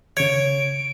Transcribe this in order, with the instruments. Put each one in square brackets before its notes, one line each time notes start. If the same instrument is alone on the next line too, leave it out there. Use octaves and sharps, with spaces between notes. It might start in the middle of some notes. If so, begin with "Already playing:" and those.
[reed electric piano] C#3 G#6 [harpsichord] C#5 [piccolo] D7